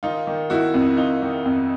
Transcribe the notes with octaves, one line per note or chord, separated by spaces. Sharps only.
D#3 D#4 F4
D#3
D#3 E4 F#4
F2
F2 D#4 F4
D#3
F2